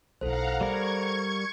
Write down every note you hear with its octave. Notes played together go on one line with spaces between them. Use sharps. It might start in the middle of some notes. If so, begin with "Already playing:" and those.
B1 E4 A4 C5 F5 F#5 A#5
G3 B3 A#4 C#6 G#6